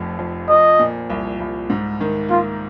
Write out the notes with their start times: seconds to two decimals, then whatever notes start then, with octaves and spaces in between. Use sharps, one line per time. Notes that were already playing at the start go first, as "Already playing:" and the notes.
Already playing: F1 F2
0.19 F2
0.49 F3 D#5
0.79 A#2
1.10 C2
1.40 C2
1.70 G#2
2.00 D#3
2.30 A#3 F4